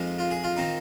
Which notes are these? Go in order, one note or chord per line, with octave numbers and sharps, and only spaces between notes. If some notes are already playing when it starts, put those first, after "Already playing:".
Already playing: F2 F3 G#3 D#4
F4
G#4
F4
D#3 C4 D#4